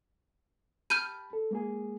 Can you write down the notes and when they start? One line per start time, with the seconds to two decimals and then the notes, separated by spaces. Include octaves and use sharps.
0.90 G4 A5 B5 F6 G6 D#7
1.33 A4
1.51 G#3 A#3 G#4